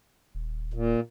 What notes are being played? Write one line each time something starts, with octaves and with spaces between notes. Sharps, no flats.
D#1
A#2